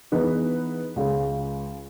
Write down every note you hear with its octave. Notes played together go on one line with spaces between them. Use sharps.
E3 B3 D#4 G#4 B4
C#2 C#3 G#3